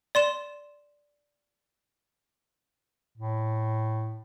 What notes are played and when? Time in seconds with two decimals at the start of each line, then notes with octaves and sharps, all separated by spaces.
0.15 D5 C6 E7
3.17 A2